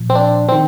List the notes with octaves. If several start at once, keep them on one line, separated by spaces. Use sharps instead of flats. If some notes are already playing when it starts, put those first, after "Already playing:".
Already playing: A#2 F3
C4
D4
D#3 C4